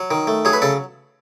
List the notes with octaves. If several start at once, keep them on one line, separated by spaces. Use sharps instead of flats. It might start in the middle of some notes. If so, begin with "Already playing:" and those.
Already playing: F#3
D#3
A3
F#3 G#4
B4
C#3 A4